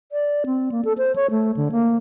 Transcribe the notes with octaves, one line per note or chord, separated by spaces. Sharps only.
D5
C4
A#3
A4
C5
C#5
A3
D3
A#3